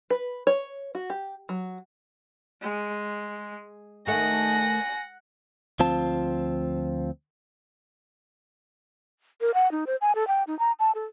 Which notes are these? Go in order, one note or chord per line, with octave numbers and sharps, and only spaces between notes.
B4
C#5
F#4
G4
F#3
G#3
D#3 A3 F#5 G#5 A#6
D2 F3 C4 F4 A5
A#4
F#5
D#4
C5
G#5
A4
G5
D#4
A#5
A5
A4